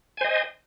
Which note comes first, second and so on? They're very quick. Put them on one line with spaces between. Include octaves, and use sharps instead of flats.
G#5 C5 D#5